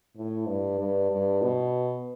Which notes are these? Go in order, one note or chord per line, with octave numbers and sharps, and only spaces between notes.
A2
G2
G2
G2
B2